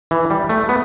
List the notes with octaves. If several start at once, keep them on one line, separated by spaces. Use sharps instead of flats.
E3
G3
A3
B3